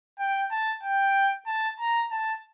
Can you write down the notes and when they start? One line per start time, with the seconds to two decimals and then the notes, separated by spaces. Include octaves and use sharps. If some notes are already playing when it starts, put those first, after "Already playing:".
0.19 G5
0.51 A5
0.83 G5
1.46 A5
1.79 A#5
2.11 A5